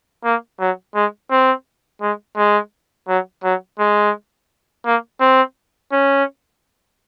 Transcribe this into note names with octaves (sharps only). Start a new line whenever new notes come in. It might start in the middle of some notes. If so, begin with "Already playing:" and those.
A#3
F#3
G#3
C4
G#3
G#3
F#3
F#3
G#3
A#3
C4
C#4